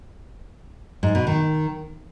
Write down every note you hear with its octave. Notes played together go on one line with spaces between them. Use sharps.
G#2
B2
D#3